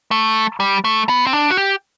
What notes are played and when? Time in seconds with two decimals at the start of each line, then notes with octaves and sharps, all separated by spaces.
0.11 A3
0.60 G3
0.84 A3
1.09 B3
1.27 C4
1.33 D4
1.51 F#4
1.57 G4